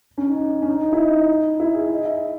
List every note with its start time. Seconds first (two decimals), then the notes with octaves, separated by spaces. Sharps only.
0.18 C#4
0.28 D#4
0.62 C#4
0.68 D#4
0.92 E4
0.99 D#4
1.60 E4
1.74 G#4
1.89 D#5
2.05 E5